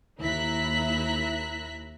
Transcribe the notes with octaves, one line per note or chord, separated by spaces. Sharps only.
D#2 E4 E5 A#5 F#6 B6